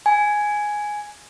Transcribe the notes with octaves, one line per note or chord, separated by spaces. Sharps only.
G#5